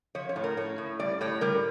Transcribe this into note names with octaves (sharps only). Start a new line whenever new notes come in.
F3 C#5
C#5
A2
A#4
A2 C#5
A2
G3 D5
A2 C#5
G3 A#4